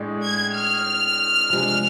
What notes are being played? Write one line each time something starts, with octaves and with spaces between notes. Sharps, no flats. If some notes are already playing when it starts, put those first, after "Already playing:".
Already playing: A2 G#3 D4 G#4
G#6
F6
C3 F3 G#3 D4